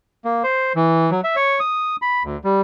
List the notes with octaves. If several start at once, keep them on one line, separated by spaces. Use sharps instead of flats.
A#3
C5
E3
F#3
E5
C#5
D#6
B5
D2
G3